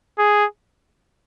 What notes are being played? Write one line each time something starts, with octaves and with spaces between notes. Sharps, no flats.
G#4